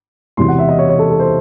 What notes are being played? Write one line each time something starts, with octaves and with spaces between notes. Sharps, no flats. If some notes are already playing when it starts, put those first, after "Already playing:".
E1 E2 C3 E3 C6
F#5
E5
D#5
C#5
C#5
A4
A4
C5